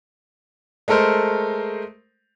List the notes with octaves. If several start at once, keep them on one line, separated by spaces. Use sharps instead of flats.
G#3 A3 A4 A#4 C5